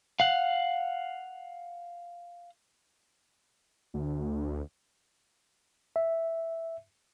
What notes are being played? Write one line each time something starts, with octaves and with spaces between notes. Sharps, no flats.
F5 F#5
D2
E5